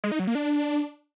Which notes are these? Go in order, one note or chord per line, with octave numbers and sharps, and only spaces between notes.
G#3
D#4
F#3
A#3
D4